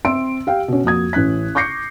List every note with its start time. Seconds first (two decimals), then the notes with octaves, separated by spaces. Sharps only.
0.05 C4 E5 C6 E6 D7
0.47 G4 F5 G5
0.68 B2 C#4
0.84 F2 A#3 F#4 D#6 G#6
1.13 A1 C#4 F#6 B6
1.55 C#6 D6 G6 A#6 C7 C#7